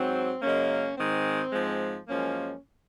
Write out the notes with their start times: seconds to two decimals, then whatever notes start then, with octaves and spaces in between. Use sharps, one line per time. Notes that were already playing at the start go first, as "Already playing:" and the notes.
Already playing: G#2 F#3 C4
0.42 F#2 C#3 G#3 A#3 C#4
0.98 G#2 D#3 G#3 C4
1.53 G#2 F3 G#3
2.08 F#2 F3 G#3 A#3 C#4